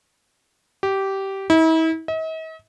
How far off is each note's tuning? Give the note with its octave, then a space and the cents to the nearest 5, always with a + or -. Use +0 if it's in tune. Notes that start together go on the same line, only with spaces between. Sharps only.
G4 -15
E4 -40
D#5 +45